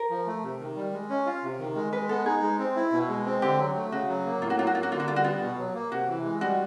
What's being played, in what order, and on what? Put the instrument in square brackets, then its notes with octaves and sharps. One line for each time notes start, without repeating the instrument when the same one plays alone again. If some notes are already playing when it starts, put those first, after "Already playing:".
Already playing: [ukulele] A#4
[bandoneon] F3
A3
C3
D#3
G3
G#3
C#4
F4
C3
D#3
G#3
[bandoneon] G#3 [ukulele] B4
[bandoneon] B3 [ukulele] A4
[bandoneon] D#4 [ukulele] G#4
[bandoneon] G#3
C4
E4
B2
G#3
C4
[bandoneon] D3 [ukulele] G4
[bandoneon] F#3
A3
[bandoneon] C#3 [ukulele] F#4
[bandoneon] F#3
A#3
[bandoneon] A2 [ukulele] F4
[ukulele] F#4
[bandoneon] F#3 [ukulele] F4
[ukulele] F#4
[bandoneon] A#3 [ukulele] F4
[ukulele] F#4
[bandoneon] D3 [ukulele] F4
[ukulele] F#4
[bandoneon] G3 [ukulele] F4
[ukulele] F#4
[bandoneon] B3 [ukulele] F4
[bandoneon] B2
F#3
A#3
[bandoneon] C3 [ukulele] F#4
[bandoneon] E3
G#3
[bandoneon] G3 [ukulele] F#4